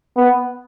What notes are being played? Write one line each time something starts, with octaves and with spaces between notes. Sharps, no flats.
B3